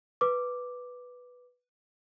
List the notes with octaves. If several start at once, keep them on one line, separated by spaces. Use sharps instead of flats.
B4 D6